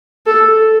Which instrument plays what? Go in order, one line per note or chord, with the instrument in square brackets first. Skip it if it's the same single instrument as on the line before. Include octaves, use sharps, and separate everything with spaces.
[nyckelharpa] A4